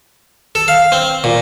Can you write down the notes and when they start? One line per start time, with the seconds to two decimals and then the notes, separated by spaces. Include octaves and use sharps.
0.55 A4
0.68 F5
0.92 C4
1.24 A#2